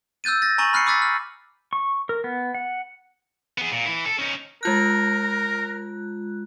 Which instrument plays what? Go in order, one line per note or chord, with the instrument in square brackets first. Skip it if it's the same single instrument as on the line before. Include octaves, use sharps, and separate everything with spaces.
[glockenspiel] E6 F#6 G6 A6 D#7
A6 A#6
G#5 A#5 C#6 D#7 F#7
B5 F6 F#6 C7 C#7
B5 D6 E6 F#6 A6 B6
F6
[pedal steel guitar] C#6
A#4
B3
F#5
[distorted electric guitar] B3 G#4
A#2
E3 E4
A4
C#4 D#4
[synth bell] G#3 F4 F#6 [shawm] A#4